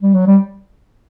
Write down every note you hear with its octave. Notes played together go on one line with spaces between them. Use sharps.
G3
F#3
G3